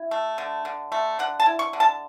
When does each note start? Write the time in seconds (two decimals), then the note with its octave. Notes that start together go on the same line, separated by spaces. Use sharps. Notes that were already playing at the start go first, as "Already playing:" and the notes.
Already playing: E4
0.11 A3
0.38 D3
0.65 D3
0.92 A3
1.19 D3 F#5
1.40 A5
1.46 E4
1.59 C#6
1.73 D3
1.80 A5